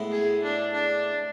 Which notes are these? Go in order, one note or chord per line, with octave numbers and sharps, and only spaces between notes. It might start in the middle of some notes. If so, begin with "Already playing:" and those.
Already playing: A2 G#3 B3 E4
G#4
D4
D4